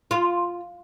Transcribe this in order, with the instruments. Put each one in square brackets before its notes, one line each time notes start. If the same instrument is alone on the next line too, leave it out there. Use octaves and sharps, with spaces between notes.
[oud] F4